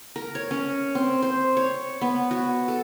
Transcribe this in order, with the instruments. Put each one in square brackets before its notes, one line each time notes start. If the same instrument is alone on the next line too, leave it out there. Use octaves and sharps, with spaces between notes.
[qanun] A#4
C#5
C#4
C4
C5
C#5
B3
F#4
A4